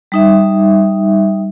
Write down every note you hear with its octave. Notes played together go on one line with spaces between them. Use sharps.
G3 D#4 E5